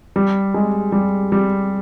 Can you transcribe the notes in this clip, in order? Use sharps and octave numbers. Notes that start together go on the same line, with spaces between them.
G3
G#3
G3
G3